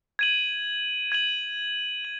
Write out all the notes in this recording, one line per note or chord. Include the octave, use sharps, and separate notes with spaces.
G#6 D#7 F#7
G#6 D#7 F#7
F#7